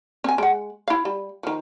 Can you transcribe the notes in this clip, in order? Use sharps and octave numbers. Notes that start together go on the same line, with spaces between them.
C4 G#5
G#3 F#5
E4 F5
G3
D#3 F3